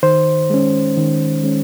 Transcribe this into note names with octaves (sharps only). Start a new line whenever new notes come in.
D#3 C5
G#3 C#4
D#3
G#3 C#4